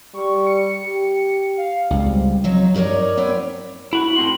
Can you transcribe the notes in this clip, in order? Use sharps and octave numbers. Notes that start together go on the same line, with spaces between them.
G3 C#6
C#7
G4
F5
C#2 G3 C4
F2 F#3 D#4
D#4 A#4 B4 C#5 D5
B3 C4 C#5 D5
E4 F#4 F#7
A2 C4 C6